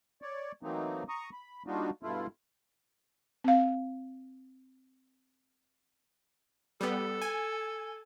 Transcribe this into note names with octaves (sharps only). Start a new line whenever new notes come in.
C#5 D5
E3 F#3 A3 A#3 C4 D#4
A#5 C#6 D#6
B5
G3 A#3 D4 D#4 F4 F#4
G2 B2 A3 E4 F4
C4 F5
G3 B3 A4
G#5